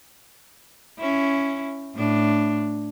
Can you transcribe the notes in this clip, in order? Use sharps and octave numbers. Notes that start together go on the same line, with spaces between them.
C#4 E4
A2 D4